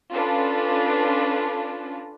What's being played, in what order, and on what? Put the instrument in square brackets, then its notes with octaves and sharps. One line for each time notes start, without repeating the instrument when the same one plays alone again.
[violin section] C#4 D4 F4 A4 B4